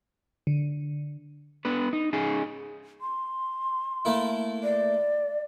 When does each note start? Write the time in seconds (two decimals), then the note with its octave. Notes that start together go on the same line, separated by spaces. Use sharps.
0.47 D3
1.65 B3 D4 B4
1.93 D#4
2.13 C#4 D#4 G#4
3.01 C6
4.05 A3 A#3 E4
4.63 D5